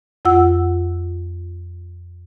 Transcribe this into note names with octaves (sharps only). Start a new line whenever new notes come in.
F2 F4 F#5 E6